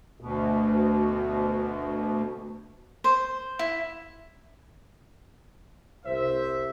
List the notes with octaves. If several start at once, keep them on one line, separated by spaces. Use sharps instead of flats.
D2 B2
C5
E4
C2 C5 E5